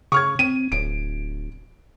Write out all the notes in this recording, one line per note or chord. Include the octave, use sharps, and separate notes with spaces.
C#3 C#6 F6 G#6
C4 D#7
D1 D7